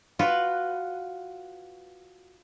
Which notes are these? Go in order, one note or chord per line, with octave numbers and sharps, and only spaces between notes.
F4 F#4 B4